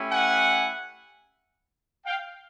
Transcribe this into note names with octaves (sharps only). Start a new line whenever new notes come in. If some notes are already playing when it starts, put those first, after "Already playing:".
Already playing: A3 C#4 E4 G4
F#5 G#5
F5 G5